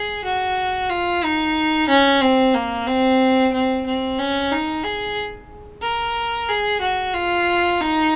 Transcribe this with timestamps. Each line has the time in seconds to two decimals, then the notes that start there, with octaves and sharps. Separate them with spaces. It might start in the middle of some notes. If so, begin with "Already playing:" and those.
Already playing: G#4
0.24 F#4
0.90 F4
1.23 D#4
1.89 C#4
2.21 C4
2.54 A#3
2.87 C4
3.53 C4
3.86 C4
4.19 C#4
4.52 D#4
4.84 G#4
5.83 A#4
6.49 G#4
6.81 F#4
7.14 F4
7.80 D#4